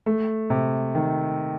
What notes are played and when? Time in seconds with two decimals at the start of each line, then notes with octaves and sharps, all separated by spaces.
0.06 A3
0.50 C3
0.95 D#3